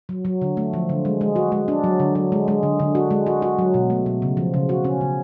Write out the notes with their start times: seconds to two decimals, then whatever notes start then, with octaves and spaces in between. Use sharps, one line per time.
0.09 F#3
0.25 F#3
0.42 D3
0.57 A3
0.74 F3
0.89 D3
1.05 G#3
1.21 G#3
1.36 F#4
1.52 G#3
1.68 D4
1.84 F#3
2.00 D3
2.15 F#3
2.32 G#3
2.48 G#3
2.63 D3
2.80 D3
2.95 F#4
3.11 G#3
3.27 F#4
3.42 F#4
3.59 F#3
3.74 B2
3.90 A3
4.06 B2
4.22 C#3
4.37 F3
4.54 C#3
4.69 F#4
4.85 C#4
5.01 C#3